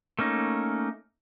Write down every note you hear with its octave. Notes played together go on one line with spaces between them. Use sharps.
A3 A#3 C#4 D#4